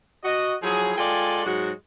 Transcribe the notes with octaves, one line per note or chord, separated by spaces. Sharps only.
F#4 D#5
F3 F#3 E4 G#4
G#3 F4 A4 D5 G5 G#5
G#2 F#3 G#3 F#4